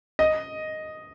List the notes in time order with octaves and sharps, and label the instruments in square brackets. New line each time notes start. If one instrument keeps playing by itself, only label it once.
[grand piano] D#5